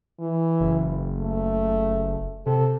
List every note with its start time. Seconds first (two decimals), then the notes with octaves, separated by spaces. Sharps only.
0.20 E3
0.60 F#1
1.19 A3
2.46 C3 A4